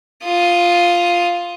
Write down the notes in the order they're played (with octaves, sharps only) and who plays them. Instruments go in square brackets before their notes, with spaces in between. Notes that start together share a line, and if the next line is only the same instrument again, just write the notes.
[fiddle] F4 D#6